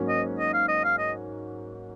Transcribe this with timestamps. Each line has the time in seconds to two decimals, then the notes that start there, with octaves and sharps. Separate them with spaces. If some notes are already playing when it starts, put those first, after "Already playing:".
Already playing: G#2 F#3 A#3 C#4
0.09 D#5
0.39 D#5
0.54 F5
0.68 D#5
0.84 F5
0.99 D#5